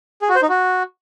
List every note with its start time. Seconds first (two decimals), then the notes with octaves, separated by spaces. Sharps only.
0.22 G#4
0.29 F#4
0.36 C5
0.42 D#4
0.49 F#4